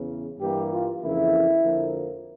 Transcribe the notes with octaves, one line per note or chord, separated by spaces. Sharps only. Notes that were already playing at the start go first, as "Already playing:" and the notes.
Already playing: E2 C#3 E3
G2 E3 G3 A#3 G4
F4
F2 C#3 E3 A#3 E4
F2 D3 F3 A#3